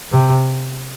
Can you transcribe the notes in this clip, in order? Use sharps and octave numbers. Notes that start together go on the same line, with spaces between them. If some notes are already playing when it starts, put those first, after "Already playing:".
C3